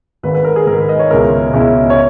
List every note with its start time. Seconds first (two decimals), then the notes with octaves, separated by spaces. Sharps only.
0.23 G#1 G#2 D#3 B4
0.35 B4
0.44 A#4
0.56 G#4
0.67 G#1 G#2 D#3 A#4
0.78 B4
0.89 D#5
0.99 C#5
1.10 C#2 B2 G#3 C#4 E4 A#4
1.53 C#2 B2 G#3 C#4 E4
1.90 C#5